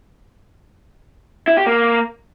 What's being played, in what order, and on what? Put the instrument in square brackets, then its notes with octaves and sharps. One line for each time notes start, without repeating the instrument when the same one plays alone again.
[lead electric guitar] E4
G4
A#3